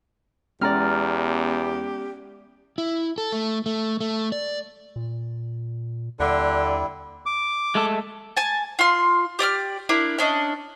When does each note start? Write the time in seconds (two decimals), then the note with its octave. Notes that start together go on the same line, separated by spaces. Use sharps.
0.61 E2 G#3 B3 C#4 G4 D5 A#5 F6
2.78 E4
3.18 A4
3.32 A3
3.66 A3
4.01 A3
4.32 D5
4.96 A#2
6.20 D#2 D3 G3 E4
7.26 D6
7.75 G#3 A3 A4
8.37 G#5 A5
8.79 F4 C6
9.39 G4 D5 D#6 F6
9.89 D4 E4 A#4
10.18 C#4 D4 D#5